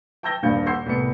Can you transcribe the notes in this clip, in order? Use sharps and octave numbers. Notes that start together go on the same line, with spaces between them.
G5 A5 E6 G6 A#6 G7
D#1 G2 F5 G6 C#7
F#5 C6 E6 G6 C7
C2 A2 B3 C#7